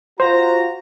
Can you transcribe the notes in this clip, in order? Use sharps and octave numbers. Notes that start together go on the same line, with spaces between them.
F4 F#4 C5 A#5